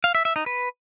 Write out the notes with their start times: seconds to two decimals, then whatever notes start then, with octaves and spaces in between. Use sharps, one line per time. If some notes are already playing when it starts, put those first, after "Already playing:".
0.04 F5
0.15 E5
0.25 E5
0.36 D#4
0.46 B4